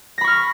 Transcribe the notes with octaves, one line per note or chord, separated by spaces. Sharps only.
B5 C#6 F6 A#6